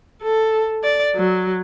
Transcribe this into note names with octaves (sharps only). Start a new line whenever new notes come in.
A4
D5
F#3